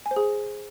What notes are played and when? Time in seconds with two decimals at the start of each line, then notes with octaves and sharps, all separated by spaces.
0.06 G#5
0.11 C5
0.16 G#4